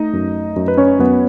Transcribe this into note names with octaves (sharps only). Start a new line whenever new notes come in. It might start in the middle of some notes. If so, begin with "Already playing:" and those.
Already playing: A3 D#4 D#5
F#2
F#2
B4
C#4 C#5
F#2 B3 B4